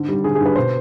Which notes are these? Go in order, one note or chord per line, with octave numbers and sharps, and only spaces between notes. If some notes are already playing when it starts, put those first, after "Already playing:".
Already playing: G#2 D3
G3
D3 G#4
G#4
G2
B4
B2 C5